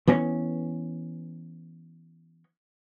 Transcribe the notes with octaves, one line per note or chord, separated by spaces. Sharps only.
E3 B3 C#4